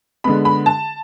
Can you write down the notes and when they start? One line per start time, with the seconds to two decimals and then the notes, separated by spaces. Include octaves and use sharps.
0.24 D3 G#3 B3 B5
0.45 B5
0.66 A5